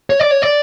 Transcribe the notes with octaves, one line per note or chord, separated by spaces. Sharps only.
C#5
D5
C#5
D5